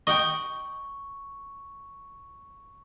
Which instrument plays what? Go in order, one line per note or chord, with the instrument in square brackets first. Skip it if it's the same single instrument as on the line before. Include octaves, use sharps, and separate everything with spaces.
[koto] D#5 F#5 G5 [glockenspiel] C#6